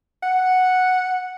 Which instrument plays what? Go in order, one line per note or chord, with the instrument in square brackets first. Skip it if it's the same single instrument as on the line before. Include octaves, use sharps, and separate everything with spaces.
[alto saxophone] F#5